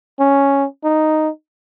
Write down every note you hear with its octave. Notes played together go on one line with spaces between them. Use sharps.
C#4
D#4